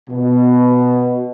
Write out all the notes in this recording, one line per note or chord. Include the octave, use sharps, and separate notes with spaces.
B2